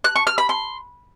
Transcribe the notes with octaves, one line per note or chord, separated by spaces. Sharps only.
F#6
C#6
F6
B5
C6